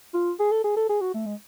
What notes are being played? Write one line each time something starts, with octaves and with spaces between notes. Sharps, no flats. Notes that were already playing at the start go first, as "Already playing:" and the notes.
F4
G#4
A4
G#4
A4
G#4
F#4
A3
G#3